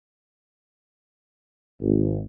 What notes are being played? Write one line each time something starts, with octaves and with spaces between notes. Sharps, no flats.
G#1